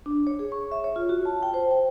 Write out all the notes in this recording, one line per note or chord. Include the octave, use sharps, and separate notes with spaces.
D4
C#5
G#4
C#6
E5
C#5
F4
F#4
A5
G5
C5
G5